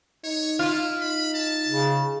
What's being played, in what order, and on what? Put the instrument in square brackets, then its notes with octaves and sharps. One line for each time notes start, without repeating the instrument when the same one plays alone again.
[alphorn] D#4 [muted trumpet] C#5
[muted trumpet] E4 [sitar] F4
[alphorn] D#4 [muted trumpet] B5
[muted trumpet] A5
[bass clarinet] C#3